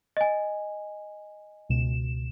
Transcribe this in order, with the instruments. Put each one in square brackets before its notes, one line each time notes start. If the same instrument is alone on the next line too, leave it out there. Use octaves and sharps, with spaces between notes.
[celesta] D#5 G#5
[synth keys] C#2 B2 E7